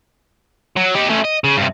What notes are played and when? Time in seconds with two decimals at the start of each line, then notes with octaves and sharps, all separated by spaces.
0.76 F#3
0.95 D#4 G4
1.09 A3 C#4
1.24 D#5
1.44 C#3
1.57 G2 C3